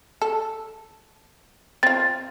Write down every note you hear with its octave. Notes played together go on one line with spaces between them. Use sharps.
A4
C4 F4 A6